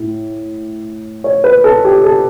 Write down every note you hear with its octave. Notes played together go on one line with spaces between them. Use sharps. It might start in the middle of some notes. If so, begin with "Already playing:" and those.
Already playing: A2
C#5
B4
A4
G4
A4